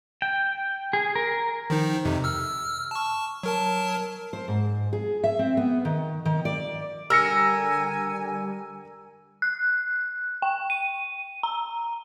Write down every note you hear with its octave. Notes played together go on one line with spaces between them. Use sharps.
G5
G#4
A#4
D#3 F3 D#4
F2 C3
E6 F6
A5 C#6
F#3 A#4 A5
C5
G#2
G#4
E5
C4
B3
D#3
D#3
D5
D3 G3 A#4 G#5 E6 A#6 C#7
F#6
G5
D#7
A#5